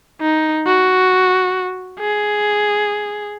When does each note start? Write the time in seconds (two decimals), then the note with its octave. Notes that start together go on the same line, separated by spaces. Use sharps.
0.21 D#4
0.66 F#4
2.00 G#4